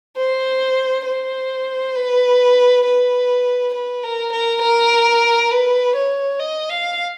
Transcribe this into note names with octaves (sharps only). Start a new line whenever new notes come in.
C5
C5
B4
B4
B4
A#4
A#4
A#4
B4
C#5
D#5
F5